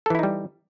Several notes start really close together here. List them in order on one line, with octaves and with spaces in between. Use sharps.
A4 E3 E4 D#4 G3